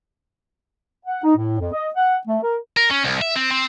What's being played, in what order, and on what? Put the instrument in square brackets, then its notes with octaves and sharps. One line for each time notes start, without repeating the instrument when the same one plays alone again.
[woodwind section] F#5
D#4
A2
F2
D#5
F#5
A3
A#4
[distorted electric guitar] A#4
C#4
C2
E5
C4
C4